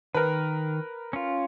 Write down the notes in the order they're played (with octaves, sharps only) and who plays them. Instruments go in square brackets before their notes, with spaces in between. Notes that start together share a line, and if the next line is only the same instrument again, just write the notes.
[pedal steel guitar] D#3 [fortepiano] A#4 B4
[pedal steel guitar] C#4 F4